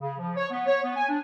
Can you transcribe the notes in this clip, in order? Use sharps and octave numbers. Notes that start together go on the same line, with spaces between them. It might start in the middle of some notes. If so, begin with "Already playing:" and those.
C#3
F3
C#5
B3
C#5
B3
G#5
D4